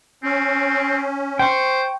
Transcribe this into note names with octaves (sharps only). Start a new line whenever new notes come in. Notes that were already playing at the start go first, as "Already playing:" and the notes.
C4 C#4
C5 G5 C#6